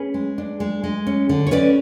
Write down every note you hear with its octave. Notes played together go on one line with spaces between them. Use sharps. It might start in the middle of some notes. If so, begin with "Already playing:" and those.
Already playing: C#4 G#4 B4
G#3
D4
G#3
G#3
C#4
D3
C#5
C#4 B4 D5